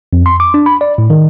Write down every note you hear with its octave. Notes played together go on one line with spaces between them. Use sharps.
F2
C6
D6
D4
B5
D5
A2
D#3